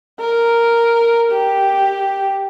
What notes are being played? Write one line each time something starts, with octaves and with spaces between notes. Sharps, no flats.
A#4
G4